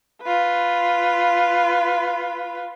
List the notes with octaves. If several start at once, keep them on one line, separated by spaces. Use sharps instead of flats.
F4 B4